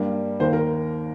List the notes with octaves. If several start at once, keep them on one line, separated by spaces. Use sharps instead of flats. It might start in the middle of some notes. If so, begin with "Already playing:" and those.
Already playing: G2 G3 A#3
D#2 D#3 A#3 C5
A#4